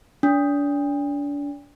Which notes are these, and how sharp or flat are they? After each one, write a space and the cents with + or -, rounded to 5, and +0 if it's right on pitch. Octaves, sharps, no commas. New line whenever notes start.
D4 -35